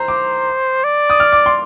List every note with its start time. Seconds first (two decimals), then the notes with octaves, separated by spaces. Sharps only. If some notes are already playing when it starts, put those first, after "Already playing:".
Already playing: C5 A#5 C6
0.08 D6
0.84 D5
1.10 D#6
1.20 F6
1.33 D6
1.46 C6